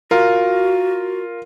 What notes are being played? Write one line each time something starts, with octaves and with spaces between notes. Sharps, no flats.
F4 F#4 A#4